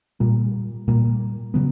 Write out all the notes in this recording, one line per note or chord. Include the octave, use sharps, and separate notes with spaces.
A#2 G3 A#3
A#2 G3 A#3
C#3 F#3 B3